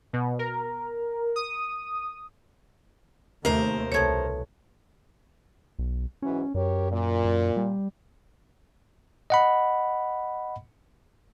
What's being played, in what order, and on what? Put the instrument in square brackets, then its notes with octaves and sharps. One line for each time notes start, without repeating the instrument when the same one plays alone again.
[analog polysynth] B2
A#4
D#6
[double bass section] D#2 A3 [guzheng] C3 [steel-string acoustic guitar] A#4 C5
[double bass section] C2 [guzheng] B2 A3 B3 [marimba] C#5 G#6
[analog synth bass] B1
[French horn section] G#2 E3 F#3 [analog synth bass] C#4
[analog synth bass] F#2 [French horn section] G4 A#4 C#5
[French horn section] A#2
[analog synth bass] F#2
G3
[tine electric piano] D#5 F#5 B5